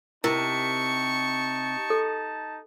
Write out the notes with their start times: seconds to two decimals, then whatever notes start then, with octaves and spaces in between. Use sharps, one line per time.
0.24 C3 D#4 E4 A#4 A5 C#6
1.90 A4